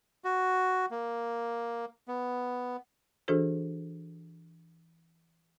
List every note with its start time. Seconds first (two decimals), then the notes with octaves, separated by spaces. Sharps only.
0.24 F#4
0.91 A#3
2.08 B3
3.28 E3 D4 F#4 G#4 A4 C5